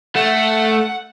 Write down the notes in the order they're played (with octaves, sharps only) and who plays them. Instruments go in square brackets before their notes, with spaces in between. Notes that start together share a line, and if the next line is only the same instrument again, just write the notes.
[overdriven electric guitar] A3 [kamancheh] F#5